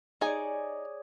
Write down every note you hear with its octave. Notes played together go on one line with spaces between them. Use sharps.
D#4 G#4 C#5 D5 G#5